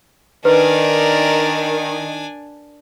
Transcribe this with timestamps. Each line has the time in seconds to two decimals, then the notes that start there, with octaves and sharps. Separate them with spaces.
0.45 D#3 D4 A#4 B4 D5 G#5